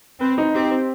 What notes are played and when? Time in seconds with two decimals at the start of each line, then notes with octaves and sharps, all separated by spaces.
0.21 C4 B4
0.38 D#4
0.54 C4 G4
0.71 C4